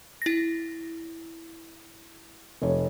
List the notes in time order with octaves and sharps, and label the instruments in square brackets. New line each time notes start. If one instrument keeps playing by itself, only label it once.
[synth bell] E4 A#6
[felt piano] F1 C#5